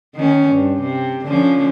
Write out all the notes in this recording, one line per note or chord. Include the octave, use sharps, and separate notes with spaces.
D#3 C#4
G2
C3
D3 F3 C#4